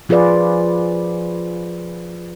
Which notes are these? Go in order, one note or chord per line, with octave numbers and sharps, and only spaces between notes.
F3 F4 G#4 B4 D5